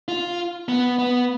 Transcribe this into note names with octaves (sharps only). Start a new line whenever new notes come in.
F4
B3
B3